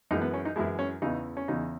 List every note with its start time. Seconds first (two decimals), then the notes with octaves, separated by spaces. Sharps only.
0.11 F#2 E3 G#3 D#4
0.21 B3
0.34 C#4
0.45 D#4
0.56 F#2 E3 G#3 E4
0.79 C#4
1.02 E2 C#3 E3 D#4
1.37 C#4
1.48 E2 C#3 E3 D#4